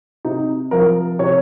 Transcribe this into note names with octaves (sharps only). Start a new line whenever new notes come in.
C3 D#4
F3 A#4
C3 C#5